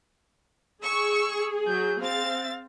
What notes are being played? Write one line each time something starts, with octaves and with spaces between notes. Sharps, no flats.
G#4 C#6 E6
F#3 G6
C4 F5 A6